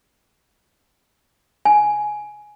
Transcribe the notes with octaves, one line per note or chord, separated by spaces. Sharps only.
G#5